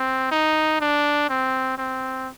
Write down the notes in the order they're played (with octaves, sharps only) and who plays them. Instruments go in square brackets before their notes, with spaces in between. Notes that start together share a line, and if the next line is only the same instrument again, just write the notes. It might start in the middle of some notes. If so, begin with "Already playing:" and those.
Already playing: [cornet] C4
D#4
D4
C4
C4